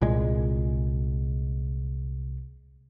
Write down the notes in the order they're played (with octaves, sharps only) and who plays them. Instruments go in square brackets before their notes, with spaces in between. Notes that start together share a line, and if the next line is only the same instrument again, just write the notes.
[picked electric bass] C2 A#2 G#3